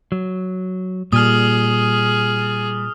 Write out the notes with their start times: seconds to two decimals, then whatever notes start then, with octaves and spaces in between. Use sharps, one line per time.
0.12 F#3
1.13 A#2 G3 G#4 D#6 F6